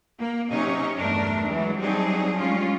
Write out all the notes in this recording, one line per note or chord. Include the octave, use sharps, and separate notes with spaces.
A#3
C3 F#3 C#4 D#4 C#5 D#5
E2 G2 A3 D4 A#4
E3 F#3 G#3
F#3 G3 C4 D4 D#4 G#4
G3 G#3 C#4 F4